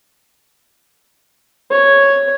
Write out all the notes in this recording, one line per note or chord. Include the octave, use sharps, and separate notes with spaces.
C#5